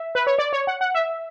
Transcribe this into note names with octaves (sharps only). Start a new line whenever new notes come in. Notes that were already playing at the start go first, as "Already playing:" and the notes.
Already playing: E5
B4
C#5
D5
C#5
F#5
F#5
E5